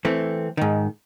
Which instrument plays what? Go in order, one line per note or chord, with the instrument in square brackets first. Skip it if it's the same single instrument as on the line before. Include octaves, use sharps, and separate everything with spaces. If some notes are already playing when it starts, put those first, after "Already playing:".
[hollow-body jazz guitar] E3 A3 C4
G#2 D#3